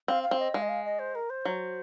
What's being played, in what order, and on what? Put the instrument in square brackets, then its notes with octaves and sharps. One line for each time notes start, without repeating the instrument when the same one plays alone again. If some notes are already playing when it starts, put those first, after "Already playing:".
[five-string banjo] C4 [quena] F5
[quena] F5
[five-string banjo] C4
[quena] D#5
[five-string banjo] G#3 [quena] F5
[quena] D#5
F5
D#5
C5
A#4
C5
[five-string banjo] F#3